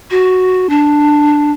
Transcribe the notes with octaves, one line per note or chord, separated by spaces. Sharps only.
F#4
D4